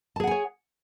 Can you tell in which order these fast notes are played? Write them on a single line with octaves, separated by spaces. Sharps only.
A5 G#4 F#5 G#5 C#5